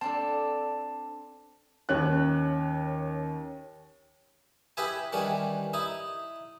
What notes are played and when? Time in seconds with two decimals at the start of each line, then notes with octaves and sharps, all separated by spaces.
0.01 C4 D4 A4 A5
1.89 D#2 C#4 F#6
4.77 E4 G4 B4 D#5 E5 G#5
5.13 D#3 E3 G3 C#4 D4
5.73 D#4 E4 D#5